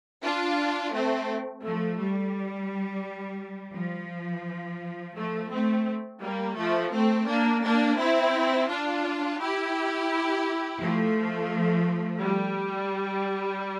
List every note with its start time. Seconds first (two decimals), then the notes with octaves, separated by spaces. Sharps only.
0.23 D4 F4
0.94 A3 C4
1.65 F3 A3
2.00 G3
3.76 F3
5.17 F3 A3
5.52 A3 C4
6.23 G3 A#3
6.58 F3 A3
6.93 A3 C4
7.29 A#3 D4
7.64 A#3 D4
7.99 C4 E4
8.70 D4 F4
9.40 E4 G4
10.82 F3 A3
12.23 G3